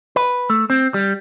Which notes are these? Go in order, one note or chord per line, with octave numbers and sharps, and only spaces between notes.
B4
A3
C4
G3